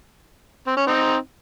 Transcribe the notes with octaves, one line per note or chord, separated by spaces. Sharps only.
C4
C#4
C4 D#4